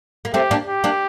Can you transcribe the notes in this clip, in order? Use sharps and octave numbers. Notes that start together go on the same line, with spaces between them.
A#3
A3 C4 G4
A#3 D4
G4
A#3 D4